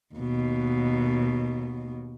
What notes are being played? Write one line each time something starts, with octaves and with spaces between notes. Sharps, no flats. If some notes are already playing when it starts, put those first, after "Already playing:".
D#2 B2